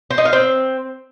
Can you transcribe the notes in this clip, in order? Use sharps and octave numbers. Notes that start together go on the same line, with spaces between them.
C5
D#4
F5
C4